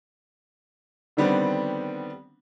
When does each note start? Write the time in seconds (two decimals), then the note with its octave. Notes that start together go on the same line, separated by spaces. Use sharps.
1.17 D3 D#3 G3 B3 C4 D4